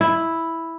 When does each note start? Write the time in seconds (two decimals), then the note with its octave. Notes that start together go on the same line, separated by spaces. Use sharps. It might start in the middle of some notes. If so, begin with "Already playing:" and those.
0.01 E4